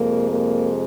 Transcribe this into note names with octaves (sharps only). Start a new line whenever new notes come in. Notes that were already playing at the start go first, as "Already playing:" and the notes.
Already playing: F2 C3 G#3 A#3
A#3